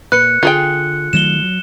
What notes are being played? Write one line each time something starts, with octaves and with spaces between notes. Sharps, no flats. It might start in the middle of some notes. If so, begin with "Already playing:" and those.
A#2 B4 F#6 C#7
D3 F4 G#4 G5
D#3 F#3 A3 E7 G7
F#3